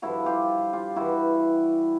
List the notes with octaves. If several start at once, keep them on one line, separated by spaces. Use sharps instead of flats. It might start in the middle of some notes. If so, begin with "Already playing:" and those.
G2 D3 F3 E4 F#4
F4 G4
F4 G4
G2 E3 E4 F#4